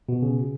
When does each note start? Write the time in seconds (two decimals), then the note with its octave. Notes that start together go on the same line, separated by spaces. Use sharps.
0.09 B2
0.22 C#3